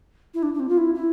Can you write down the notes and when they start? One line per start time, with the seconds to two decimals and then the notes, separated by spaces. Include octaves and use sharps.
0.34 E4
0.43 D4
0.54 D4
0.60 C4
0.69 F4
0.78 E4
0.95 E4